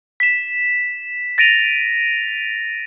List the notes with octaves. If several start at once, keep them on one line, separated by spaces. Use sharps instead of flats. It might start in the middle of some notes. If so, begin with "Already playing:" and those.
B6 E7
A6 A#6 D7 D#7 F7